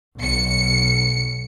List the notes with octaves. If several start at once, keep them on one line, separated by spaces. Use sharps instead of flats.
B1 C#7